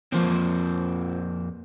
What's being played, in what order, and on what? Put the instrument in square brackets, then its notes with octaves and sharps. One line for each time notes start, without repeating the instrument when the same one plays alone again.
[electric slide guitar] F2 A#3 C4 [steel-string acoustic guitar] F3 C5